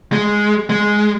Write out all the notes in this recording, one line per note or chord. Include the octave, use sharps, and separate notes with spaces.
G#3
G#3